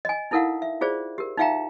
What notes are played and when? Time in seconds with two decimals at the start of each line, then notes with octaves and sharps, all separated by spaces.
0.05 D#5 G#5
0.31 D#4 E4 A4 A#4 F5 F#5
0.62 E5
0.81 F4 G#4 C5 D5
1.18 G4 A#4
1.37 D#4 F4 E5 F5 G5 A#5